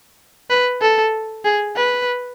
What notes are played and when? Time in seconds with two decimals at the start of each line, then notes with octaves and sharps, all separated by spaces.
0.50 B4
0.82 A4
1.45 G#4
1.77 B4